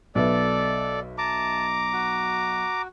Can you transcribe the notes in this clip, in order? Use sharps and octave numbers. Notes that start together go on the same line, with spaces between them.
B1 A4 B4 D5 E5
A5 A#5 D6
F#4